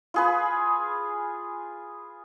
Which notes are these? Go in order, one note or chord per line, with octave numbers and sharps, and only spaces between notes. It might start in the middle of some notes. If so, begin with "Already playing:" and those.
F4 G#4 B4